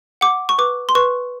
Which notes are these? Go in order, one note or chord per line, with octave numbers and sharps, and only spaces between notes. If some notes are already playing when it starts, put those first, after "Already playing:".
F#5 D6
C#6
B4 D6
C6
B4 C#6